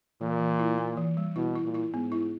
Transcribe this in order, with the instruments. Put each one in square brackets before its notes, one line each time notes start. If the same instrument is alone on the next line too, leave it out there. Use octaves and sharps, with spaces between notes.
[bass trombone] A#2 [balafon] E3
[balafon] E3
E4
A#3
E3
G3
[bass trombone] B2 [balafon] E4
[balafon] E4
[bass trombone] A#2
[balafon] E4
[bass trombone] G#2 [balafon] B3
[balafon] E4